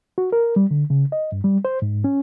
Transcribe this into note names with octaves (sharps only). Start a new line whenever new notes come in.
F#4
A#4
G3
D3
C#3
D#5
G2
G3
C5
G#2
C#4